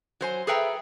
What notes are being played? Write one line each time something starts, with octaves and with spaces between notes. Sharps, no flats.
F#3 C5 G#5
G#4 A4 B4 E5 G5 A#5